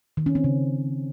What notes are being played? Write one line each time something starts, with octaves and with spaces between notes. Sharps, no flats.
D#3
C#4
C4
C#3